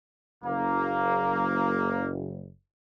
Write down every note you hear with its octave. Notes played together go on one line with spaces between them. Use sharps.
F#1 A#3